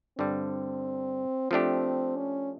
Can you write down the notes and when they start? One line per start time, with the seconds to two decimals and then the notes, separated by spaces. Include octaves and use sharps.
0.18 G2 D3 G3 C4
1.51 F3 A3 C4 D4 G4
2.16 C#4